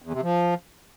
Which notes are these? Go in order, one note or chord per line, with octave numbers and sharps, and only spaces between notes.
E2
C3
F3